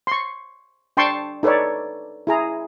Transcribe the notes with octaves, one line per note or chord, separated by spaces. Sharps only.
C6 C#6
D4 G5 A5 C6 C#6
D#4 A4 B4 C#5 D5
E4 G#4 A#5